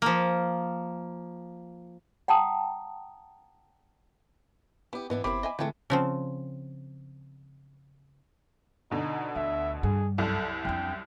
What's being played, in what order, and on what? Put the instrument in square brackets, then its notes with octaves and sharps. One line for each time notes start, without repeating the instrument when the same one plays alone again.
[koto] F3 A#3
[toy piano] F#5 G5 A5 A#5 D#6
[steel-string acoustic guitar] B3 G4 [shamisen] E4
[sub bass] G#2 [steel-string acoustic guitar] E3 B3 D4 [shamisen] D#5
[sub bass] G1 [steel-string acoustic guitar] C4 E4 [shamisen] G4 A#4 [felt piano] B5 D6
[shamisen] D#5 E5 G#5
[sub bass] D3 [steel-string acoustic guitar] E3 G#3 A3 [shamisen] C4 G5
[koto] C#3 F3 C4
[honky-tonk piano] B2 D3 [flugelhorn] D#4
[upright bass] D2 [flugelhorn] E5
[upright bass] G2 [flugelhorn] G#4
[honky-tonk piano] C2 F#2 [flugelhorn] A4
[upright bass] F2 D4 [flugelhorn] G5